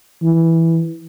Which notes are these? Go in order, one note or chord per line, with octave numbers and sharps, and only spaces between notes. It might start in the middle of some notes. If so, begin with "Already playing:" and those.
E3